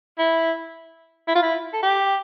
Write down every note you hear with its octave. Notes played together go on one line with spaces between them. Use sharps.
E4
E4
F4
E4
A4
G4